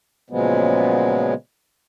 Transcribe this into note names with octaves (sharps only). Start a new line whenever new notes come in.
A#2 C#3 F3 F#3 G#3 B3